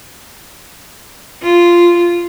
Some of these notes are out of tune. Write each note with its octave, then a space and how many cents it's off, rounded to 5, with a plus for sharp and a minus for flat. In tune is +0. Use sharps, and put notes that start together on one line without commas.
F4 -10